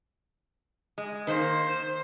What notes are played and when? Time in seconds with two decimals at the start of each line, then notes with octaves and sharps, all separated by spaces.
0.98 G#3
1.27 D#3 A#3 C5